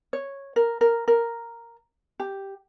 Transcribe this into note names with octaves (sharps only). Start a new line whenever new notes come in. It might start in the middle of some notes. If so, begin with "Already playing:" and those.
C#5
A#4
A#4
A#4
G4